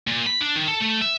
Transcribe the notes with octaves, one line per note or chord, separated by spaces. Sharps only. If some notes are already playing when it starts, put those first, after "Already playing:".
A#2
B5
D4
D#3
A4
A3
E5